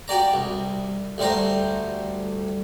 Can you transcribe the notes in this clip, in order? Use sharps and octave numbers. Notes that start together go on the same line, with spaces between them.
F#4 G4 D5 A#5
C2
D2 G3 A3 C5 A#5